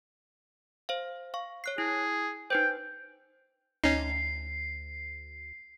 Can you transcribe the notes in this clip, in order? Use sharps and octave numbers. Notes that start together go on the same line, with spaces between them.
C5 F5
F5 C#6
C#5 F#6 C7
E4 G#4
D#4 B4 C5 G5
D2 C#4 D#4 C7